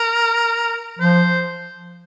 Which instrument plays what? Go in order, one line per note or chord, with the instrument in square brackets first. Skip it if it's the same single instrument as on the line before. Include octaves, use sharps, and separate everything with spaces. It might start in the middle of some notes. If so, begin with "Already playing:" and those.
Already playing: [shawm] A#4
[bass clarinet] F3 [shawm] C5